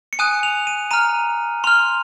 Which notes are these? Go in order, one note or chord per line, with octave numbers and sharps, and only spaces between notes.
C#7
G#5 D#6 F#6 D#7
F7
D#7
A#5 F6 D#7
C6 F6 F7